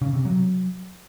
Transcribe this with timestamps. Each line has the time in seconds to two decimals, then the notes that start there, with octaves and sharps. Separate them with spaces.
0.02 C#3
0.13 C3
0.25 F#3